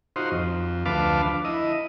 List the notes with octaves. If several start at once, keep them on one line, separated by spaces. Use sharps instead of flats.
D#4 F4 F#4 C5
F2
D2 F3 B4 F5 A5 D6
E4 D#5